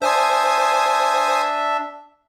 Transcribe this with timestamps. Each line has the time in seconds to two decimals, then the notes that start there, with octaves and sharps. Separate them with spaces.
0.02 D4 C5 E5 G#5 D#6